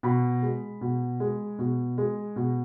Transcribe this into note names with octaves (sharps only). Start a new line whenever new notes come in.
B2 B5
G#3
B2
G#3
B2
G#3
B2